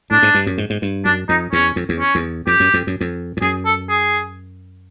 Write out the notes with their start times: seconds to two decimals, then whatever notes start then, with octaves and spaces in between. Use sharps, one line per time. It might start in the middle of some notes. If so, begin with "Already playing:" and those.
0.11 A2 D4
0.23 G#2
0.34 G2
0.46 F#2
0.58 G#2
0.70 G#2
0.82 G2
1.05 F#2 D4
1.29 F2 D#4
1.53 E2 C#4
1.76 F2
1.89 E2
1.99 C#4
2.15 E2
2.47 F2 G4
2.60 F#2
2.74 F2
2.87 F#2
3.01 F2
3.37 F2
3.41 F#2 G#4
3.65 A4
3.89 G#4